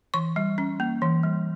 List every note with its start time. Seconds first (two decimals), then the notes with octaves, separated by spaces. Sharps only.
0.14 E3 C#6
0.36 G3
0.58 C#4
0.80 A#3
1.02 E3
1.23 G3